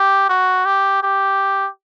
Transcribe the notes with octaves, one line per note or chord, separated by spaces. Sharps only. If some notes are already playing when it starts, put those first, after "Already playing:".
Already playing: G4
F#4
G4
G4